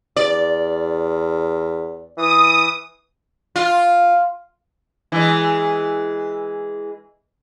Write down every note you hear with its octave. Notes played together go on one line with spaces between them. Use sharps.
E2 D5
E3 D#6
F4
E3 G#3